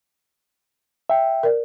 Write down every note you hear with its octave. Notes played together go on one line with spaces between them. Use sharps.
E5 G5
A#4 D5